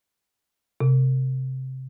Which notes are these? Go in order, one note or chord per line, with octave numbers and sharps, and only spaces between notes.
C3